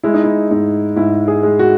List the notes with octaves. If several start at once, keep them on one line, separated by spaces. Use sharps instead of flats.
G#3 E4
D#4
E4
G#2 D#4
G#2 E4
G#4
G#3
F#4